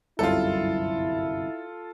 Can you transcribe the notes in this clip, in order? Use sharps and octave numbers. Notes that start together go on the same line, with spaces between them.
G1 C2 F#2 E4 F4 A4